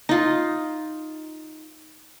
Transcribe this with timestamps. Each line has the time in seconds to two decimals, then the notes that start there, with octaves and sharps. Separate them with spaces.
0.09 D#4 F4